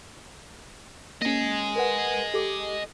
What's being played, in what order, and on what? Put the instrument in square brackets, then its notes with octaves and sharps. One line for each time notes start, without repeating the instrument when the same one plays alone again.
[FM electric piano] A#3 C#4 [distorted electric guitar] D#5 G#5
[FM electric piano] A#4 B4 F#5
G4 A4 D6